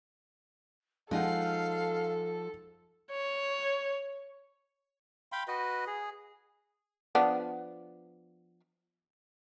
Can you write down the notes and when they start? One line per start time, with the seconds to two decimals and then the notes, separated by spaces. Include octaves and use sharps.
1.11 F3 G#3 D#4 A4 F5 F#5
3.11 C#5
5.32 F5 G5 B5 C6
5.48 F#4 B4 D#5
5.87 G#4
7.15 F3 B3 D4